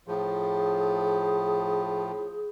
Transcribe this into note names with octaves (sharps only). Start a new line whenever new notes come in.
A2 F3 G#4